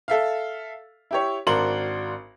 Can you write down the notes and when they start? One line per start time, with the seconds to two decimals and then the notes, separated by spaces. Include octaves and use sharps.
0.08 A4 E5 F5
1.11 E4 G4 C#5
1.47 G#1 D4 F#4 A#4 C6 F#7